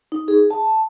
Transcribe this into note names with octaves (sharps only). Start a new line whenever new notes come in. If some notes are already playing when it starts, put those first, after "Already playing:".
D#4
G#4
A5